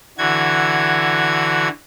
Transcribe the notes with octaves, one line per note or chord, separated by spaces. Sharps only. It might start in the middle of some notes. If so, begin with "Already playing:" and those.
D3 E3 F#4 G#6